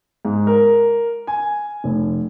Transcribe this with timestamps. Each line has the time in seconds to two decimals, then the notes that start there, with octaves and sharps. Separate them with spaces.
0.25 G#2
0.47 A#4
1.27 G#5
1.84 F1